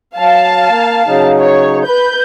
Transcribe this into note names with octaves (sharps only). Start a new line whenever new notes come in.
F#3 F5 A5
A#3
C#3 F#3 D#4
C#5
B4 G6